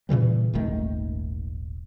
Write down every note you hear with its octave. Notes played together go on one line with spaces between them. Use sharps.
A#2 C#3 E3 G3
D#1 G#1 D#3 A3